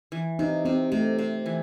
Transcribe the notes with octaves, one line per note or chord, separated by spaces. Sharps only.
E3
C3 D#4
C3 C4
C3 A3
C3
E3